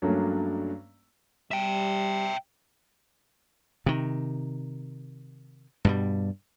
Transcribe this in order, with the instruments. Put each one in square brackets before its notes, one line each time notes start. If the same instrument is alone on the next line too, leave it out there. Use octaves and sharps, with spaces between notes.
[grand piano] G2 F#3 A3 A#3 C#4 D4
[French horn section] G3 [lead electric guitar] E5 G5
[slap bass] C3 D#3
G2 B2 G3